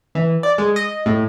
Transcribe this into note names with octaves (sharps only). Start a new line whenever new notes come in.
E3
D5
G#3
D#5
A2